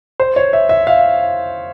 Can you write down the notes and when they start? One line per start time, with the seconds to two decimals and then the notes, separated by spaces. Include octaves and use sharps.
0.20 C5
0.36 C#5
0.53 E5
0.69 E5
0.87 F5